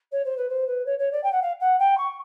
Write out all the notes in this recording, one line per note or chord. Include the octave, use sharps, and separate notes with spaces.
C#5
C5
B4
C5
B4
C#5
C#5
D5
G5
F#5
F5
F#5
G5
C#6